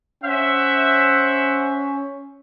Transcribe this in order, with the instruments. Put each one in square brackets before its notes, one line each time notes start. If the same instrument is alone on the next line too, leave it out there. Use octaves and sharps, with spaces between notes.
[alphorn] C#4 [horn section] C5 E5 F#5